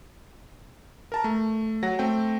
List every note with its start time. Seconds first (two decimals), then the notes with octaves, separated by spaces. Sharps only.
1.12 A#4 A5 A#5
1.24 A3
1.83 F#3 F#5 A#6
1.99 A3 C4 G5